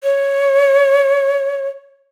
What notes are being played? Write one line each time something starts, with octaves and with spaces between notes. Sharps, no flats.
C#5